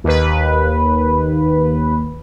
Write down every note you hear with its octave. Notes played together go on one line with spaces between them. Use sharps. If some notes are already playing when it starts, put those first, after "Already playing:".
D#2 B4